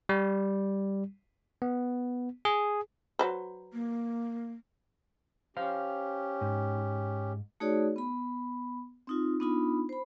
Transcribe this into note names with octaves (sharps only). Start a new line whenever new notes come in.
G3
B3
G#4
F#3 B4 C5
A#3
C#4 G4 C5 F5
G#2
A3 D#4 F#4 G#4 C#5 D5
B3 B5
C4 D#4 F4
B3 D4 D#4 F4 B5
C5 B5